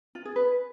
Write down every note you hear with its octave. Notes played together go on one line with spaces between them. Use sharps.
F4
G#4
B4